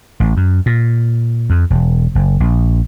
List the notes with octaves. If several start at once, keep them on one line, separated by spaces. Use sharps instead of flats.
A1
F#2
A#2
F2
E1
F#1
A#1